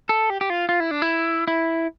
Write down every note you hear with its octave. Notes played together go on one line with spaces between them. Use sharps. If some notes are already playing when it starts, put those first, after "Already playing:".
A4
G4
G4
F4
F4
E4
D4
E4
E4